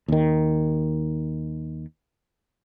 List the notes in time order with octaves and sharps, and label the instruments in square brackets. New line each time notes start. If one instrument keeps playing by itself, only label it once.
[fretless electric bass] D#2 D#3